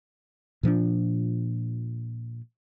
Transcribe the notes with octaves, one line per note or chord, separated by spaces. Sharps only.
A#2 F3 C4 D4